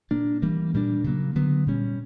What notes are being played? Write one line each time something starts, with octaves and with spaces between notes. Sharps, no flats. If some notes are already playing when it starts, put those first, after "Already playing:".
A#2 A#3 D4
E3 G3 A#3
A#2 G3 A#3 D4
C#3 F#3 A#3
D3 F#3 B3
A#2 G3 C#4